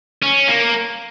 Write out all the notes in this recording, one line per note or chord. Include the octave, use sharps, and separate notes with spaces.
C#4
A#3